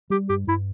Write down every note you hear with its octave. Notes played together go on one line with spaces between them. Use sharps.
G3 G4
G2 G4
G2 E4